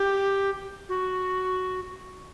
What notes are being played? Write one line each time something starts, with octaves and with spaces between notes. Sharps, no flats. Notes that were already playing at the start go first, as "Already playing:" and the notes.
Already playing: G4
F#4